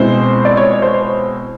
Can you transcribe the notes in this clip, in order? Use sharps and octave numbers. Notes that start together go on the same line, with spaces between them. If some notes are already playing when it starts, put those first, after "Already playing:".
Already playing: B2 G#3 C4 E4 C5
D5
C#5
C5